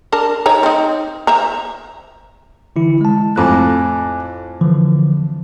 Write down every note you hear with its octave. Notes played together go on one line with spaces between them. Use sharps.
D4 A#4 A5
D#4 C#5 A#5
C4 D#4
C5 E5 A#5
D3 E3 E4
G#3 A5
F2 A2 G#5 D6 F#6
D3 E3 F3